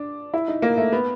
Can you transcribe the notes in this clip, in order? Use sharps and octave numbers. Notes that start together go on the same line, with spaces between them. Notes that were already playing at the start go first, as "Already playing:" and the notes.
Already playing: D4
E4
D#4
A#3
A3
B3